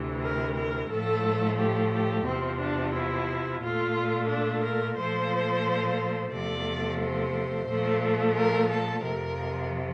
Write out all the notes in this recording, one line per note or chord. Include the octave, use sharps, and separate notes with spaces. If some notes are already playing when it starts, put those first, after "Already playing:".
Already playing: D2 C3 E3
A#4
A#4
A2 F3 A3 A4
G4
G4
E2 C3 F3 C4
D4
E4
A#2 A3 F4
D4
A#4
A#2 F3 A3 C5
E2 C3 F3 A3 D5
C5
A#2 F3 A3
A#4
A4
F2 C3 F3 A#4